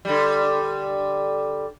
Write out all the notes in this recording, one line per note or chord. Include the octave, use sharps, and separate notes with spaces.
D3 G3